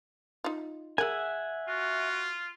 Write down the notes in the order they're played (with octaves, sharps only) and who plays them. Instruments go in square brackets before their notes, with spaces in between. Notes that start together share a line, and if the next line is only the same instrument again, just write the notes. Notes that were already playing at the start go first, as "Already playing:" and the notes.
[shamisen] D#4 F4
[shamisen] G#4 A#4 [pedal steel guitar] E5 F#5 G#5
[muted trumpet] F4 [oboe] F#4